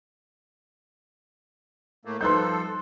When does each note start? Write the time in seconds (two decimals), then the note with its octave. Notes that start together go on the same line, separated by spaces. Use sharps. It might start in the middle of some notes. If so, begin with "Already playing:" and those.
2.05 A2 A3 A#3
2.21 F3 G3 D#4 A4 B4 C6 F#6 G6